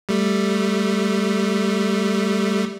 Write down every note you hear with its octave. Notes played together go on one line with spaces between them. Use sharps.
G3 A3